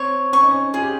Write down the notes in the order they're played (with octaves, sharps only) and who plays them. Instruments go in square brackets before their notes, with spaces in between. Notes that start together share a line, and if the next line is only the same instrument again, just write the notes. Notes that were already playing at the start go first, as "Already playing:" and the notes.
Already playing: [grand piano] C4 [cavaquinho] C#5
[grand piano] C#4 [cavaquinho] C#6
[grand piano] D#4
C#4
[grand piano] F4 [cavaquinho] G#4
[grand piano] G4